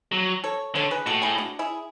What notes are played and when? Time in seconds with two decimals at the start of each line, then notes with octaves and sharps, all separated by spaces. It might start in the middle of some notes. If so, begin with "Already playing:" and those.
0.12 F#3
0.44 A4 C#5
0.75 D3 A4 C#5
0.91 G#4 B4
1.06 A2 F#4 A4
1.22 E4 G#4
1.38 D4 F#4
1.59 E4 G#4